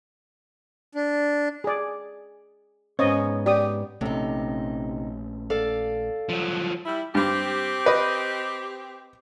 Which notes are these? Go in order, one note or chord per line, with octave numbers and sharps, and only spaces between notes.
D4
G#4 D5
G#2 B3 C#4 C5 C#5 D#5
G4 D5 D#6
A#1 C3 A3 C#4 D#4
A4 D5 F5
F3 F#3
G3 E4
G2 C4 G4
B4 D#5